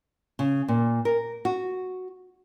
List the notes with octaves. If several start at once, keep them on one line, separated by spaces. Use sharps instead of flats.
C#3
A#2
A#4
F#4